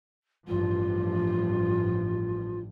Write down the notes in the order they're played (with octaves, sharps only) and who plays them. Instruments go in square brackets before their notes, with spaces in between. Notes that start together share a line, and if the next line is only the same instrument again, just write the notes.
[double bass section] A1 G2 F3 [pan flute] F4